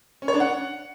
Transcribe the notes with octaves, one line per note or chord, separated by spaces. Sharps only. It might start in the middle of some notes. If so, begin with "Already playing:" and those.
C#4
C#5
D4
F#5